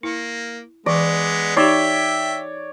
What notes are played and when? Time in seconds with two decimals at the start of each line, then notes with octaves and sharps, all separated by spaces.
0.03 A#3 E4
0.86 E3 G#3 B3 D5
1.57 D#4 G4 C#5 D5 E5 G5